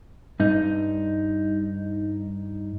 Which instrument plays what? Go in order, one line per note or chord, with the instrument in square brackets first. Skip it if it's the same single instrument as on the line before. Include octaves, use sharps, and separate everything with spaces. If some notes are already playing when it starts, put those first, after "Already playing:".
[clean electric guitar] G2 D#4